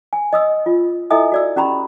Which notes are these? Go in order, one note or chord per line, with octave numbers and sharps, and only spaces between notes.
G#5
D#5 D#6 E6
F4
E4 A4 D#5 E5 G#5 D#6
F#4 D5 E6
C#4 G4 A#5 B5